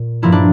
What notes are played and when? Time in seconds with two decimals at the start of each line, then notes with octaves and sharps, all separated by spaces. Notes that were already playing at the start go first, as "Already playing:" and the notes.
Already playing: A#2
0.22 G2 F3 A#3 E4
0.32 D4